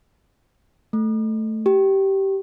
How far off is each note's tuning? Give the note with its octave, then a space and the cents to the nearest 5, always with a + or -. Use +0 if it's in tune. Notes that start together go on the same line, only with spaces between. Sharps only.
A3 +0
G4 -15